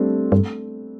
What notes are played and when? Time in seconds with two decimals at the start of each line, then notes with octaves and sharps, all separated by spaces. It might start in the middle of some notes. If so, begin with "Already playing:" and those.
Already playing: G3 A3 C4 D4
0.32 G2 A3